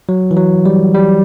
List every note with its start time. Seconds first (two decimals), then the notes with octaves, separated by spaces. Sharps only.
0.09 F#3
0.31 E3
0.37 F#3
0.66 G3
0.95 G3